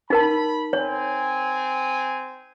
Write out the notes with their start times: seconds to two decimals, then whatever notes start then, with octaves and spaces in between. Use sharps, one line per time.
0.10 D#4 A#4 A5 B5
0.73 C4 C#5 G#5